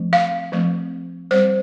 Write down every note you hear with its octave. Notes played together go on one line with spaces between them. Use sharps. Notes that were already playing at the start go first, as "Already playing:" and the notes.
Already playing: F3 A3 C4
F5
F3 A3 C4
G3 C4 C5